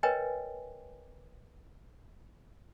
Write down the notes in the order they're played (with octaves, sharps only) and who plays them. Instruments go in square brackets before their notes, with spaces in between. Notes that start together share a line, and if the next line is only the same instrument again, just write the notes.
[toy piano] A#4 B4 C#5 D#5 G5 G#5